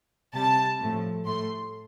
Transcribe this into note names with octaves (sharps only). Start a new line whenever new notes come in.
C3 G3 A5
A2 F3 A3
A2 A3 C6